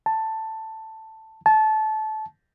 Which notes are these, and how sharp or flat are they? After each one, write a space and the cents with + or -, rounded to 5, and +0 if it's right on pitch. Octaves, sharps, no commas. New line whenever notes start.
A5 +10
A5 -20